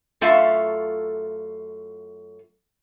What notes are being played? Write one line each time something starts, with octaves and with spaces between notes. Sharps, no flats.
F#2 A3 F4 A4 E5 F5